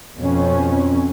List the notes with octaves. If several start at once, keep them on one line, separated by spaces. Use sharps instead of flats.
F2 B2 C#4